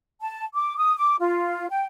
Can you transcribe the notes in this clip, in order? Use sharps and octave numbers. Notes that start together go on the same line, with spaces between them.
A5
D6
D#6
D6
F4
G5